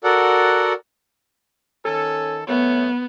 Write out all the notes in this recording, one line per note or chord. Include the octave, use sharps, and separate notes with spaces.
F#4 A4 A#4 D5 F#5
D#3 C#4 A4
F#2 A3 B3 C#5